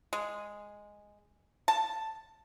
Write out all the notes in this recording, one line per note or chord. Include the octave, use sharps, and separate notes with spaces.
G#3
A5